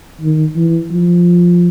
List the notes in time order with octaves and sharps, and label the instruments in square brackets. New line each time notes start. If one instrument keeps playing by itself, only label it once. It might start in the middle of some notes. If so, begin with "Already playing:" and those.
[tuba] D#3
E3
F3